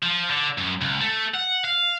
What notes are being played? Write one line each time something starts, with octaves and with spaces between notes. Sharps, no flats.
F3
D3
F#2
C#2
A3
F#5
F5